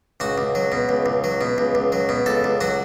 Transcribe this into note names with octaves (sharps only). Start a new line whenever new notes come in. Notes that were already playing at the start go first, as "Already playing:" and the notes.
C#2 F#4
C#2
F#3
B2
C#2
C#2
F#3
B2
C#2
C#2
F#3
B2
C#2 A4
C#2
F#3 F#4